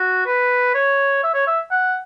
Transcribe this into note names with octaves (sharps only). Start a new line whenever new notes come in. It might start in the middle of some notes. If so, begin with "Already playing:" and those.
Already playing: F#4
B4
C#5
E5
C#5
E5
F#5